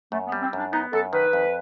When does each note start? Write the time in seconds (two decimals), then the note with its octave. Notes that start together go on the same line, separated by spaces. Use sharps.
0.12 F#2 A3
0.27 B3
0.32 G3
0.42 C4
0.53 F#2 D4
0.72 B3 D#4
0.93 F#2 A4
1.13 D#3 B4
1.33 F2